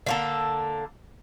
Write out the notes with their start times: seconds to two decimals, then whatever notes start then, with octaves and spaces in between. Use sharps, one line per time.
0.06 D3 A#3 A4